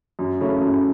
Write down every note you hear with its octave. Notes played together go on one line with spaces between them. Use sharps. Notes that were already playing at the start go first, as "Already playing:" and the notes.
F#2
C#3 A3 C#4 E4
F#2